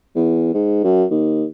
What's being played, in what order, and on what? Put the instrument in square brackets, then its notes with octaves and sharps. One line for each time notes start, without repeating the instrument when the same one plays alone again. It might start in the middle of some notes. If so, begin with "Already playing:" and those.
[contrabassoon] E2
G#2
F#2
D#2